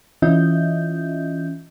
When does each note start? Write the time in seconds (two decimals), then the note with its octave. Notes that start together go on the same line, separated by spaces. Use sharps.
0.22 E3 C#4 F4 D#5 E5 G6